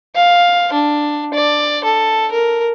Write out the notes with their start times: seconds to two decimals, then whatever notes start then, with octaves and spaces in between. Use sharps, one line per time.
0.15 F5
0.73 D4
1.34 D5
1.84 A4
2.32 A#4